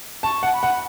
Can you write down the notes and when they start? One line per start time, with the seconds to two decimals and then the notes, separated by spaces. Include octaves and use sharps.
0.23 A5 C#6
0.43 F#5 A5
0.53 B5
0.63 F#5